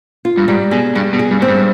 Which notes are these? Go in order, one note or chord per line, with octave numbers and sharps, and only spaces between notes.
F4
G2
G#2 G3
B2 G#4
G2 G3
B2
G#4
G2
G#2 C4
G2